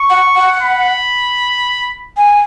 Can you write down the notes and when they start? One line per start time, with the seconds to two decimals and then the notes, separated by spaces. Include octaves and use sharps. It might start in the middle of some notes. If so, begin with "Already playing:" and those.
Already playing: C#6
0.10 F#5
0.36 F#5
0.62 B5
2.17 G#5